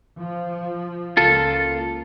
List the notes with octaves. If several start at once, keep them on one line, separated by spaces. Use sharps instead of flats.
F3
C#2 A#3 F4 A4